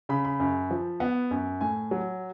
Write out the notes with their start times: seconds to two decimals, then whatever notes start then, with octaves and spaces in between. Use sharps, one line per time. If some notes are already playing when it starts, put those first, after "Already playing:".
0.09 C#3 B5
0.25 B5
0.40 F#2
0.71 F3
1.00 B3
1.31 F#2
1.61 A2 G#5
1.91 F#3